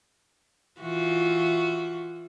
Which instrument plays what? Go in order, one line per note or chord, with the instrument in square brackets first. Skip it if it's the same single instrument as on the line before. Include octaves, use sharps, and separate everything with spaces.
[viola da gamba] E3 F4 F#4